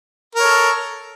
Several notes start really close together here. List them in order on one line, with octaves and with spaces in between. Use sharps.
A#4 C#5 A4